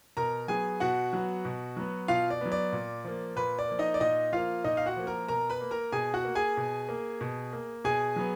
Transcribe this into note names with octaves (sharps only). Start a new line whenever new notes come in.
B2 A#4 A#5
F#3 B3 G#4 G#5
B2 F#4 F#5
F#3 B3
B2
F#3 B3
B2 F4 F5
D5
F#3 B3
D5
A#2
F3 A#3
A#2 B4
D5
F3 A#3
D#4 D#5
D5
A#2 D#4 D#5
F3 A#3 F4 F5
A#2 D#4 D#5
F5
F#4 F#5
F3 A#3
A#4 A#5
B2 A#4 A#5
B4 B5
A#3
A#4 A#5
B2 G#4 G#5
F#4 F#5
A#3
G#4 G#5
B2
A#3
B2
A#3
B2 G#4 G#5
F#3 B3